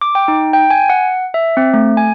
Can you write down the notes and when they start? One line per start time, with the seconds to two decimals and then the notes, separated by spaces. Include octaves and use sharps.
0.01 D6
0.15 G5
0.28 D#4
0.53 G5
0.70 G#5
0.90 F#5
1.34 E5
1.57 C4
1.74 A3
1.97 G#5